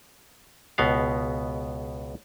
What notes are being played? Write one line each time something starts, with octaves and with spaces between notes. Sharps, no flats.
C#2 B2 B3 F5